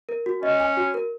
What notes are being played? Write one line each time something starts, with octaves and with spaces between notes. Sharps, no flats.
A#4
F#4
C#4 D#5
G#5
F#4
A#4